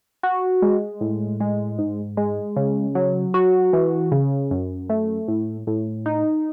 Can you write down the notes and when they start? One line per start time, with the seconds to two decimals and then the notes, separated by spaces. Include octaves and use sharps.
0.23 F#4
0.62 G#3
1.01 A2
1.40 G#3
1.79 G#2
2.17 G#3
2.56 C#3
2.95 F#3
3.34 F#4
3.73 E3
4.12 C#3
4.51 F#2
4.89 A3
5.28 A2
5.67 A2
6.06 D#4